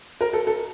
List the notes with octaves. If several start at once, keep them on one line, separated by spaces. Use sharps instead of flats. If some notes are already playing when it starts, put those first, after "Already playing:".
A#4
A4
A4